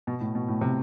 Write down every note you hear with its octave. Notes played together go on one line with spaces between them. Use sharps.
B2
A2
B2
A2
C3